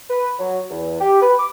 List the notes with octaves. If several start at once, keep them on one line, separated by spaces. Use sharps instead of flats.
B4
F#3
E2
G4
B4
D6